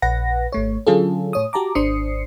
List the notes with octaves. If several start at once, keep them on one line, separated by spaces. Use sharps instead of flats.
A#1 B4 F#5 A#6
G#1 A3 C#5
D3 F#3 C#4 F4 G#4 A4
A2 C#5 D#6
F#4 G4 A5 A#5 D6
G#1 D4 C5 D#6 C7 C#7